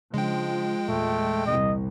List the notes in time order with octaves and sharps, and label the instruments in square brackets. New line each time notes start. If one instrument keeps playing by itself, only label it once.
[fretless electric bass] C#3 D4 [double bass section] F3 [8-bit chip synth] G#3 G5
[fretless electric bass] E2 A#2 [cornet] A3
[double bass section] C2 [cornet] D#5